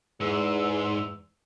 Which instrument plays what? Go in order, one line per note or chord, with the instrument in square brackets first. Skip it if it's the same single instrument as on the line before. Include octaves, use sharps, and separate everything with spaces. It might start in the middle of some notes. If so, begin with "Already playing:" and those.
[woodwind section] E2 E6 [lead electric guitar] G#2